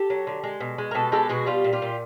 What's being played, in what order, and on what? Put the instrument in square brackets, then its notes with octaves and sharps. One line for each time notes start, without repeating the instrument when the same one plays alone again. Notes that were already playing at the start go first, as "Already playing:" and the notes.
Already playing: [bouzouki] G4 A4
F#3
D3
G#3
B2
G#3
A#4
B2 G4 A4
G#3 G4 A4
B2 F#4 G#4
G3 F4 G4
A#2
F4 G4
A#2